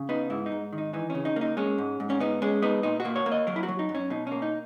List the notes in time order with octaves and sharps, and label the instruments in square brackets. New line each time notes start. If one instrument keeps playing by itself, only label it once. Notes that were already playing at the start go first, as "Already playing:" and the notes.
Already playing: [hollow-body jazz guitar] C#3
B3 D#4
G#2 E4
D#4
G#2
D#3
D#4
E3 D#4
C#3 C#4
D#4
A#3 D#4
G#3 C#4
G#2
G#2
C#4
B3 D#4
G#3 C#4
B3 D#4
A#2 D#4
F#4
A#3
C#5
A#3
D#5
F#3 A#4
E4
F#4
F#3
D#4
F#2
C#4
B2 D#4
A#3 C#4
D#4